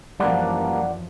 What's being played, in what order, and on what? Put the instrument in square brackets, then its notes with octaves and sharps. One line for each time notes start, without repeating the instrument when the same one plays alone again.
[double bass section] F#2 E3 F3 [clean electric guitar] G3 A#3 D4 [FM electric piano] D5 F#5